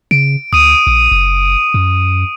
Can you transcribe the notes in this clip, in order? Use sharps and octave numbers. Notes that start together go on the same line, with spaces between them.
C#3 D7
D2 D#6 D#7
A#1
F#1
F#2